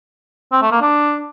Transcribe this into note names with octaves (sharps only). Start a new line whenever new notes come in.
C4
A3
A#3
D4